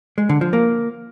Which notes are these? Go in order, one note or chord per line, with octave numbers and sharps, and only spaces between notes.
G#3
D3
F3
A#3